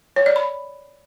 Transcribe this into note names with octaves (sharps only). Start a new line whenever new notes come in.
C#5
D5
B5